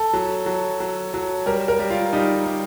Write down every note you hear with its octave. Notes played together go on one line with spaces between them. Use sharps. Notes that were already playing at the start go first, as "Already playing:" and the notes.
Already playing: A4
F#3
F#3
F#3
F#3
G3 A#4
A#4
G3
F4
G3 D#4
G3